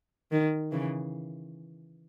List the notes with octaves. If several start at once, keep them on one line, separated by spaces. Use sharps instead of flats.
D#3
C#3 E3